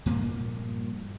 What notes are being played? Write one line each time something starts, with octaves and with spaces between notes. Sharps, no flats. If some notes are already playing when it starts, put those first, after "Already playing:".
G2 A#2 F3 A#3